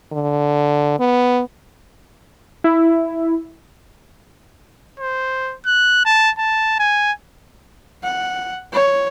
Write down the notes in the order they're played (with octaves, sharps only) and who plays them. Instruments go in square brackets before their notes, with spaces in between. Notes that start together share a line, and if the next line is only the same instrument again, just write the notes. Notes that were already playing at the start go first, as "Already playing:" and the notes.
[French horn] D3
B3
[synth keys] E4
[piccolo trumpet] C5
F#6
A5
A5
G#5
[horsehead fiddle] F#5
C#5